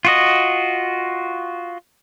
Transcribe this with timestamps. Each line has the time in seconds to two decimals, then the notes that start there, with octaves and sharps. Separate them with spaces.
0.05 F4 F#4 D#5